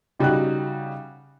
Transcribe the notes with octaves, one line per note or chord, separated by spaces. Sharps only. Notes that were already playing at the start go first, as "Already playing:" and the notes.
C#3 G3 D#4 F#4 G5 F#6